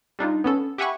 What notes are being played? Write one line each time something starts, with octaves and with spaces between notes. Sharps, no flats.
G3 D4 D#4 F4
B3 C#4 A4
G4 E5 F#5 G#5 B5 C#6